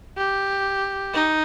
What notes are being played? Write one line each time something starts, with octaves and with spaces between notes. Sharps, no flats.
G4
D#4